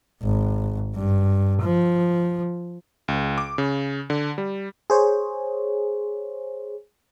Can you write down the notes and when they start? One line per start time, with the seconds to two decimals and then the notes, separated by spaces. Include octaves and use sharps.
0.23 G#1
0.95 G2
1.62 F3
3.08 C#2
3.38 D6
3.58 C#3
4.10 D3
4.38 G3
4.90 G#4 C5 C#5